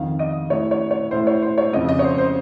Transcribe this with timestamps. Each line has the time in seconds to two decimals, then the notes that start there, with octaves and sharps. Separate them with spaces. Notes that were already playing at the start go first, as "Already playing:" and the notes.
Already playing: F2 D#3 F5
0.19 D#5
0.50 A2 C#5
0.71 C#5
0.91 C#5
1.11 A2 C5
1.27 C#5
1.42 C5
1.58 C#5
1.73 F2 C#3 D#5
1.89 D#5
1.99 C#5
2.04 C5
2.18 C5